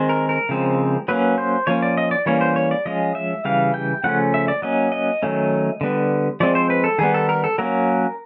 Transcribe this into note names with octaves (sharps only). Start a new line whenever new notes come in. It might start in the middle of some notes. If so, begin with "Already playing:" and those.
Already playing: D#3 G#3 C4
A#4
A#4
C#3 F3 G#3 C4
F#3 A#3 C#4 B4
C5
F3 A#3 C#4 C#5
D5
D#5
D5
E3 G3 A#3 C#4 C#5
C5
C#5
D5
F3 G#3 C#4 D#5
E5
C#3 E3 G3 F5
G5
C#3 F3 A3 C#4 F#5
E5
D5
F#3 A#3 C#4 D#5
D#5
D#3 F#3 A3 C#4
D3 G3 B3
F3 G#3 C4 D5
C5
B4
A4
D#3 G3 B3 G#4
A4
A#4
A4
F#3 A#3 C#4 A#4